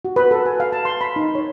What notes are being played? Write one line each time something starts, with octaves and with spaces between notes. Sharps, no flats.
F#4
B4
A4
G#5
F5
A5
C6
B5
D#4
C#5